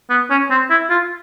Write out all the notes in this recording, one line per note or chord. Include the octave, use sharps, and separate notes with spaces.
B3
C#4
C4
E4
F4